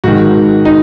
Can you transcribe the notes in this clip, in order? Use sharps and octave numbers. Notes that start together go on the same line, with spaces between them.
G#2 D#3 F#4
D#4